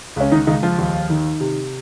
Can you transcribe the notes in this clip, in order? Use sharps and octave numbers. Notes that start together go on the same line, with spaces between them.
C#2 C#4
D#3 D#4
C#2 D#3 D#4
F3 F4
D#2
D#3
C3